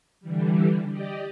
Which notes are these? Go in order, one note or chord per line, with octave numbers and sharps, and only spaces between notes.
D3 E3 G3
G4 D5 D#5